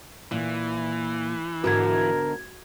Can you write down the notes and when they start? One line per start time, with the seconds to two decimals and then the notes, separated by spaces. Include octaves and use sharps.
0.31 A#2 E3
1.64 G#2 B2 D3 F#4 A#4 G#6